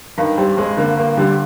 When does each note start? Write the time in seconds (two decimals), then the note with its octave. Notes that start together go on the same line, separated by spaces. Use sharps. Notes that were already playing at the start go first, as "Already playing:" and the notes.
0.17 G2 D#3
0.37 G3 C4
0.57 G#3 C4
0.77 D3 A#3
0.97 G2 A#3
1.17 D3 G3